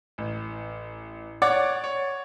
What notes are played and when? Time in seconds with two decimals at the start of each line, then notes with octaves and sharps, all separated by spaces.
0.18 A1
1.42 C#5 D5 F#5 D6 A6
1.84 C#5